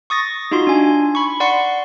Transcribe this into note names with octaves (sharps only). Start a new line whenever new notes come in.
C#6 D#6 A6 A#6
D#4 F4 F#4 C6
D4 G#5
B5 C#6
D5 F#5 C6 C#6 C#7